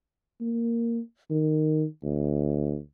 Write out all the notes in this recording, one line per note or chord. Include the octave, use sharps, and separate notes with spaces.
A#3
D#3
D2